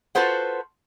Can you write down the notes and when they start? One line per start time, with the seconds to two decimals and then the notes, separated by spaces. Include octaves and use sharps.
0.15 F4 F#4 A4 B4 C5 F#5